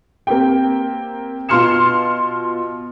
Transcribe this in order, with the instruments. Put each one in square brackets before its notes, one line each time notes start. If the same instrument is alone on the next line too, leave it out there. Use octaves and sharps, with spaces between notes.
[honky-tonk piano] A#3 C4 G4 G5
B2 F4 C6 F6 C#7 E7